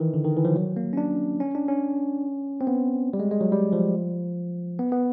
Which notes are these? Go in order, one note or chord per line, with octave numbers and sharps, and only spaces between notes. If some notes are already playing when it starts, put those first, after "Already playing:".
Already playing: D#3 E3
D3
D#3
E3
F3
F#3
A#3
C#4
D4
C#4
D4
C#4
C4
B3
G3
G#3
G#3
F#3
G3
F3
B3
B3